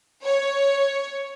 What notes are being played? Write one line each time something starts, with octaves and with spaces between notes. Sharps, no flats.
C#5